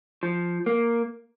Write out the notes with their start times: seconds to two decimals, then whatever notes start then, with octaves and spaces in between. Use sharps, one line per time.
0.23 F3
0.66 A#3